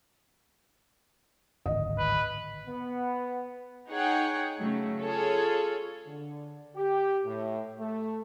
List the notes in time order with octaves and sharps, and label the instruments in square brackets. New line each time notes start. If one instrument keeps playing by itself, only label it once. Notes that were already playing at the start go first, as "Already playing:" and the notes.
[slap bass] D1 G#1 [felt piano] D#5
[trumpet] B4
[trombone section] B3
[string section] D#4 G#4 C#5 F#5 G5
C#3 F#3 A3
F4 G#4 A4 C#5
[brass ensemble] D3
G4
A2
A3